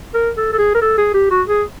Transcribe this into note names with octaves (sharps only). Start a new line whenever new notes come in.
A#4
A4
A4
G#4
A#4
A4
G#4
G4
F#4
G#4